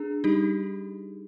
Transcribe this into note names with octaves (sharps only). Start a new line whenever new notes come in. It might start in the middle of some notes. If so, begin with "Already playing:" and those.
Already playing: D4 G#4
G3 D#4 G4